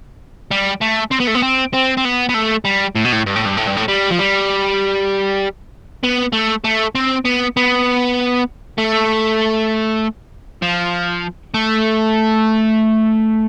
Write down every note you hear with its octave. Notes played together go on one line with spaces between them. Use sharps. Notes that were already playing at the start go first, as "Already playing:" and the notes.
G3
A3
C4
B3
A3
B3
C4
C4
C4
B3
B3
A3
G3
A2
B2
A2
G2
A2
G2
A2
G2
A2
G3
F3
G3
B3
A3
A3
C4
B3
B3
A3
F3
A3